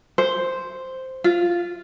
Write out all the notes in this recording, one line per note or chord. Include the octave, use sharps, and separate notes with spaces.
C5
F4